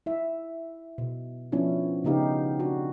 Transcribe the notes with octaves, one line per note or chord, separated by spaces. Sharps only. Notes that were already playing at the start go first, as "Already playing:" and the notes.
E4 E5
B2
F3 B3 C#4 D4 E4
C#3 B3 D#4 G4 F5
D4 F#4